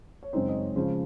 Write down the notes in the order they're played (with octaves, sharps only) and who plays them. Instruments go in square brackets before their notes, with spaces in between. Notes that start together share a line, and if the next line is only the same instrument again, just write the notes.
[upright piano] C#5
F#2 C#3 G#3 C4 D#4 C5
D#5
C#5
C#3 F3 G#3 C5